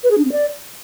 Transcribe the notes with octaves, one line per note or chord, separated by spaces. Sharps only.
B4
G#4
D4
C4
D5